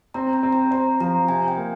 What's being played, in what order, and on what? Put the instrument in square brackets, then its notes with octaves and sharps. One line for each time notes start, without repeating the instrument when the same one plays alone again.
[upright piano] C4 [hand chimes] A#5
[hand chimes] A#5
[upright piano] C4
[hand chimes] A#5
[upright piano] C5 [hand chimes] A#5
[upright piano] F3 [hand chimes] A#5
[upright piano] C3 [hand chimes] G#5
[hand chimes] G5
[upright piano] A#3